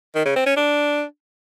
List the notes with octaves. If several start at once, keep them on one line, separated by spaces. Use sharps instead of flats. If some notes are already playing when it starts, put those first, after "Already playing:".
D#3
C#3
C4
C#4
D4